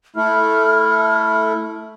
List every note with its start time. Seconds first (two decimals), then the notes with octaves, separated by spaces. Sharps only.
0.16 A3 E4 F6